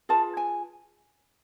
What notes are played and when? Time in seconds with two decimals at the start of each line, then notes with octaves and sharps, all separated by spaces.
0.09 F4 G#4 B4 A5
0.37 G#5